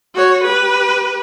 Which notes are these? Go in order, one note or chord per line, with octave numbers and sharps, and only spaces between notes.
F#4 C#5
G4 B4